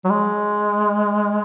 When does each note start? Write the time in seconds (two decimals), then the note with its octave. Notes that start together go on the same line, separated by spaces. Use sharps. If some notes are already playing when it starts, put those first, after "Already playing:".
0.05 F#3
0.10 G#3